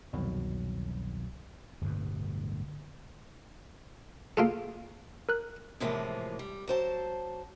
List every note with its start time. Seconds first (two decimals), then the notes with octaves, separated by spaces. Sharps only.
0.13 C2 F2 B2 D#3 F#3
1.81 D1 G1 G2 B2
4.37 A#3 F4 G#4 A4 F5
5.29 A#4 F#6
5.80 A2 C3 E3 F3 G#3 A#3
6.39 G3
6.68 F#3 C5 A5